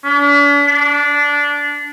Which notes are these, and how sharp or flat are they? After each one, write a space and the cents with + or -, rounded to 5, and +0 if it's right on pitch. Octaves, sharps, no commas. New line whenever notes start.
D4 -45
D4 -15